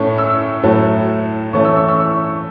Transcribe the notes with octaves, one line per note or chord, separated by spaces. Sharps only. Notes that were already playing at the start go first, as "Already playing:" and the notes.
Already playing: A2 A3 C#4 C#6
E6
A2 F#3 A3
E3 A3 C#4 C#6
E6
C#6
E6
C#6